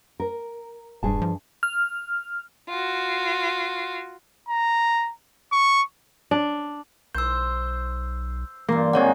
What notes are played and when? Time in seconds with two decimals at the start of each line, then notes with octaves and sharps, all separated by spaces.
0.20 A#4
1.03 E1 G2 G#4 A5
1.22 F3
1.63 F6
2.68 F4 F#4
4.49 A#5
5.52 C#6
6.31 D4
7.15 B1 C5 E6 G6
8.69 G2 E3 A#3 C6
8.93 G#2 D#3 C4 G#4 C#5 F#5